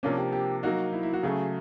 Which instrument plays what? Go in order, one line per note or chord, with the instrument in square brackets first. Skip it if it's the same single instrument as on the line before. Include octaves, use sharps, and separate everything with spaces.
[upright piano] C3 F3 A#3 D4 [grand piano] C#4
[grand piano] G4
G4
[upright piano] F#3 A#3 D#4 [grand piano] F#4
[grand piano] E4
E4
F#4
[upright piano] C#3 F#3 A3 [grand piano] G#4